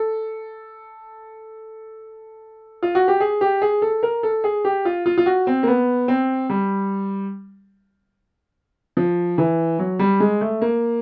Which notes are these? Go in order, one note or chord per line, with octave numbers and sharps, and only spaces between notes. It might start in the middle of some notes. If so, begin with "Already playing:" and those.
Already playing: A4
F4
F#4
G4
G#4
G4
G#4
A4
A#4
A4
G#4
G4
F4
F4
F4
F#4
C4
A#3
B3
C4
G3
F3
E3
F#3
G3
G#3
A3
A#3